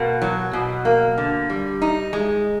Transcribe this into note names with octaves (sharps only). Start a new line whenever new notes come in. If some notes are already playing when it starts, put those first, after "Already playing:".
Already playing: B2 A#3
F#3
B2
A#3
D3
G3
D#4
G#3